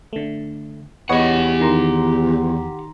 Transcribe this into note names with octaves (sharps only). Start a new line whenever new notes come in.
D3 A3
E2 G4 B4 C#5 D#5 F#5
D#3 A#5 C6